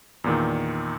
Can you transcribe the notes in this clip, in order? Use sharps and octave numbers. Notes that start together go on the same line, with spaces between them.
E2 A#2 D#3